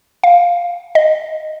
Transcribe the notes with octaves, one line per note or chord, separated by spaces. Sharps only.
F5
D#5